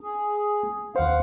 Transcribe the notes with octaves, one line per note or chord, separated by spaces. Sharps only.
G#4
D#2 C5 F5 F#5